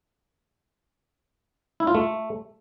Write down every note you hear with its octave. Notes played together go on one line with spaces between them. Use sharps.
E4
F4
A3